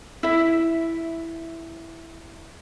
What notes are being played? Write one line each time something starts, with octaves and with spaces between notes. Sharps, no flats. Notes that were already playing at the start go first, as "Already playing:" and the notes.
E4 E5